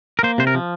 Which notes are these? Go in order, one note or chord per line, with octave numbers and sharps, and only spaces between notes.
A#4
A#3 C5
C3 C5
A#4
F3